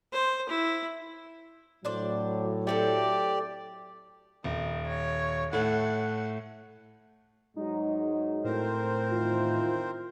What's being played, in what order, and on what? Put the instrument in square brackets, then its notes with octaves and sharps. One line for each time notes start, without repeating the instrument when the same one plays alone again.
[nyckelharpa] C5
E4
[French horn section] A2 F#3 [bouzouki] D4 C5 D5
[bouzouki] A3 C4 A4 [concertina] G4 D5
[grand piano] D#1 [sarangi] D#3
[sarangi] C#5
[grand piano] A2 A3 [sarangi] F#5
[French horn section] G#2 F#3 G#3 [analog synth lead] D#4
[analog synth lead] A2 [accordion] C4 A#4 C5
[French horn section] E2 D#3 E4 [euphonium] F4